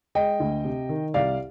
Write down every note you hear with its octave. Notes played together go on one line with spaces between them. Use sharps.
G#3 D#5 G5
D2
C3
D#3
C2 D5 F5